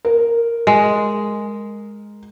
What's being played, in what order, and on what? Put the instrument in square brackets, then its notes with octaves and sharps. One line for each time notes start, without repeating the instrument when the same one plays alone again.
[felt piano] A#4
[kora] G#3